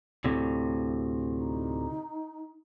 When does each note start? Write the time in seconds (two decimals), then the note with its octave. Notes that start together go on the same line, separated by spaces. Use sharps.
0.24 D2 A2 C3
1.36 D#4